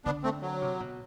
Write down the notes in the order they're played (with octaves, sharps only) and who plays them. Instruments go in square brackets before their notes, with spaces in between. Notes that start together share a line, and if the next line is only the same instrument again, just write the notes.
[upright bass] D3 [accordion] B3 D4
[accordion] A3 C4
F#3
[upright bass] C3
B2